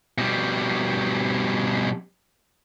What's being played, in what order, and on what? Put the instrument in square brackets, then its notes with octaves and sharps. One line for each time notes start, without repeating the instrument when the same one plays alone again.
[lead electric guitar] B2 G3